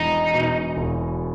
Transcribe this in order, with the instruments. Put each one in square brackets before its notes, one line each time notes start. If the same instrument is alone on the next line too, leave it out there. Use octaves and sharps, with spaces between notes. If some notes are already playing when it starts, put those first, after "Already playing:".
Already playing: [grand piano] E1 E2 [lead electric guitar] D#4
[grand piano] B2
E1